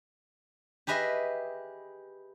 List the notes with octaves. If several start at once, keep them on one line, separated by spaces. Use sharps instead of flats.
G4 G#4 B4 D#5 E5